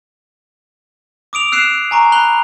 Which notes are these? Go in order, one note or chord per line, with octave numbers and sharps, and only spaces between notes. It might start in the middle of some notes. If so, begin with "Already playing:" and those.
D6 D#6 D7 F7
E6 F#6 C7 D7 E7
G#5 A#5 C#6
B5 F#6 F7 G7